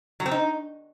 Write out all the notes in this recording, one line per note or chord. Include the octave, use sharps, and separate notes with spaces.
F#3
C4
D#4